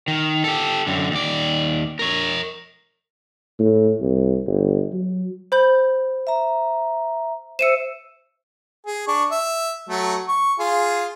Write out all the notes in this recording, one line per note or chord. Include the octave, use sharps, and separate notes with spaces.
D#3
G4 A4
F#2 D3
D#2 D5
A#4 C#5
A2
C2
G1
F#3
C5 B5 G6
E5 A#5
C5 E5 E6 C#7 D#7 E7
G#4
D4 C#6
E5
F#3 A3
C#6
F4 G#4